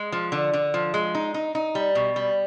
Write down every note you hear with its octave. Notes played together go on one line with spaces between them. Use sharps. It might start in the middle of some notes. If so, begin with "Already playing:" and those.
Already playing: G#3
F3
D3
D3
F3
G#3
D#4
D#4
D#4
G3
B2
G3